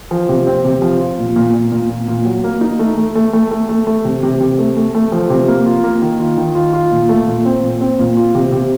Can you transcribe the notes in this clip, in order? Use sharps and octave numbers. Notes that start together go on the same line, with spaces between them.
F3
C3
C4
C3
F3
F4
A#2
A#2
A#2
A#2
A#2
A#2
F#3
A#3
D#4
A3
A3
A3
A3
A3
A3
A3
C3
C3
C3
A3
A3
A3
F3
C3
A#3
F4
A#3
D#3
F4
D#3
F4
F4
A#2
A3
A#2
C4
A#2
C4
A#2
F4
C3
C3